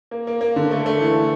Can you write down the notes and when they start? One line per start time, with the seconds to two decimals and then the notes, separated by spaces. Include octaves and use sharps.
0.11 A#3
0.27 A#3
0.41 A#3
0.56 D3
0.71 A3
0.86 A3
1.01 E3